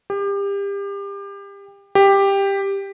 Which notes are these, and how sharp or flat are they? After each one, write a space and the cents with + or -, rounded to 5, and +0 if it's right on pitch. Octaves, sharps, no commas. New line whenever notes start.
G4 +30
G4 +10